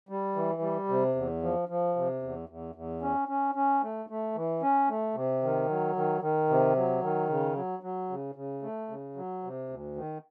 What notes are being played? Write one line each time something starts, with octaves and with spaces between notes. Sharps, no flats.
G3
E3
G3
C3
E2
F3
F3
C3
E2
E2
E2
C#4
C#4
C#4
A3
A3
E3
C#4
A3
C3
D#3
F#3
D#3
D#3
C3
F#3
D#3
C#3
F#3
F#3
C#3
C#3
A3
C#3
F#3
C3
D2
D#3